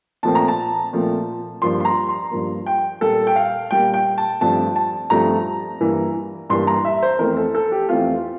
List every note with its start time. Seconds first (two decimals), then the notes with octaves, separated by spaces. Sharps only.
0.23 A#2 F3 A3 C4 A5
0.35 A#5
0.48 A5
0.93 A#2 F3 A3 C4
1.62 G2 F3 A#3 C6
1.80 C6
1.85 A#5
2.09 C6
2.31 G2 F3 A#3
2.66 G5
3.01 A#2 G3 A#3 A4
3.27 G5
3.36 F5
3.71 A#2 G3 A#3 G5
3.94 G5
4.18 A5
4.41 G2 F3 A3 C4 A5
4.76 A5
5.10 G2 F3 A3 C4 A#5
5.80 G2 E3 A#3
6.50 G2 E3 A#3 C6
6.67 A#5
6.85 E5
7.03 C5
7.19 F2 E3 A3 C4 A#4
7.37 A4
7.55 A4
7.72 G4
7.89 F2 E3 A3 C4 F4